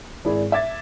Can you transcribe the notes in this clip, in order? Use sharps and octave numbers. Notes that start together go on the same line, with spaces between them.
G#1 E4 G#4 D5
E5 D6 G#6 A6